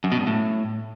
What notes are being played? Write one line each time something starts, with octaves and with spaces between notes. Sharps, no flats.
F#2
B2
G2
A2